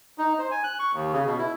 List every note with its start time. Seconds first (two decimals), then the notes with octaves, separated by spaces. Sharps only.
0.18 D#4
0.39 C5
0.51 G#5
0.64 F#6
0.79 C#6
0.93 D#2
1.13 C#3
1.26 B2
1.39 E4